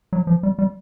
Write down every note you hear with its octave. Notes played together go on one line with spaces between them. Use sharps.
F#3
F3
G3
G3